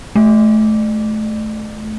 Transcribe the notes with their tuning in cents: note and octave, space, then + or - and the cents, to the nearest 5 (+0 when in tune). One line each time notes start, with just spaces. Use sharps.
A3 -25